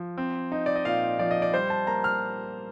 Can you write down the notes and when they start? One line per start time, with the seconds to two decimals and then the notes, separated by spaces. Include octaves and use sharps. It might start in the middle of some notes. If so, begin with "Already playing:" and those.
Already playing: F3
0.18 C4
0.52 D#4
0.66 D5
0.76 D#5
0.85 A#2 F5
1.19 F3 D5
1.31 D#5
1.42 D5
1.53 G3 C5
1.70 A5
1.87 A#3 A#5
2.04 F6